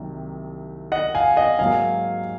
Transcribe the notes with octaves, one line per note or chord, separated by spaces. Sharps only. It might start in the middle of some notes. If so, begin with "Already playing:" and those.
Already playing: C2 C3 D#3 F#3 A#3
D#5 F#5
F5 G#5
D#5 F#5
G#2 F#3 A#3 F5 G#5